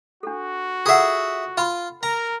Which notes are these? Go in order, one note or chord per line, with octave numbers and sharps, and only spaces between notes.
D4 F#4 A4
F4 G#4 A4 E5 F#5
F4 B5
A#4 A#5